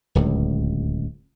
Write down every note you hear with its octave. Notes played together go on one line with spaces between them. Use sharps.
D1 C#2